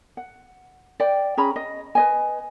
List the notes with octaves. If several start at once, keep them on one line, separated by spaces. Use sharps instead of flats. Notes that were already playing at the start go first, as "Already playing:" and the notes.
F#5
D5 G5
C#4 G#4 A#5 B5
D#5
B4 D#5 G#5